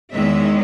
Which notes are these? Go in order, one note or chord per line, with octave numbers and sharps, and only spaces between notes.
E2 D#3 G#3 C#4 E5